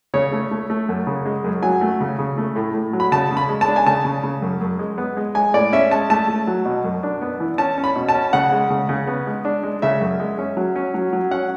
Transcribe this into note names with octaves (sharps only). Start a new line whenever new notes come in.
C#3 C#5
A3
A3
A3
F#2
C#3
G#3
F#2
F#3 G#5
A3
C#3
C#3
A3
A2
A2
F#3
B5
C#3 A5
C#3
B5
G#3
A5
D4
G#5
C#3 A5
C#3
C#3
F#2
F#2
G#3
B3
G#3
G#3 G#5
A2 D5
C#4 E5
G#3 A5
A3 A5
A3
F#3
B2
F#2
D4
B3
E3
C#4 A5
C#4
B5
B2
A5
C#4
C#3 F#5
G#3
C#3
C#3
B3
G#3
D4
G#3
C#3 E5
F#2
G#3
C#4
F#3
C#4
F#3
F#3
C#4 F#5